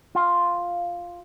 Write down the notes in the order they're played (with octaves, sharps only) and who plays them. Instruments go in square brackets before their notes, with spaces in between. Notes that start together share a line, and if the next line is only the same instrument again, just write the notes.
[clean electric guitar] F4